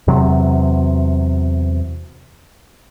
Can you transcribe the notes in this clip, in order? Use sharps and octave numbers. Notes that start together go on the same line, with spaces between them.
E2 C3 F#3